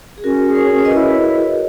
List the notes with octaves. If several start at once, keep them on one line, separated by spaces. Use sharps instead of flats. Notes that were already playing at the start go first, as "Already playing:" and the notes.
G#4
C#4 F#4 A#4
G#4
A#4 C#5
C#4
C#5
B4 D#5
E4